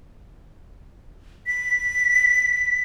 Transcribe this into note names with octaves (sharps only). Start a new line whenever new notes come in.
B6